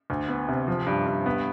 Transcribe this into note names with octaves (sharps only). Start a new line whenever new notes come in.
D2
B3
C3
F3
G2
G2
B3